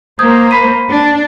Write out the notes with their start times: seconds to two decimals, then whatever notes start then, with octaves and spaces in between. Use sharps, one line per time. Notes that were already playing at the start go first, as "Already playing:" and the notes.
0.19 A#3 C5 D#6 G6 G#6
0.51 B5 B6 D#7
0.90 D4